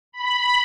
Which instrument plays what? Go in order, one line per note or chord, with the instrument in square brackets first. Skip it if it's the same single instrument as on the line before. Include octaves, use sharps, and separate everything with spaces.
[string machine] B5